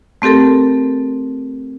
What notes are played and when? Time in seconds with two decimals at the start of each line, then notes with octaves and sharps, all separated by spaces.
0.22 A3 C4 G4 A4 A#4